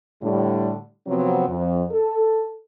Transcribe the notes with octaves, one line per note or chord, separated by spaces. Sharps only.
A2 D3 G3
C3 F3 F#3 B3 C4
F2
A4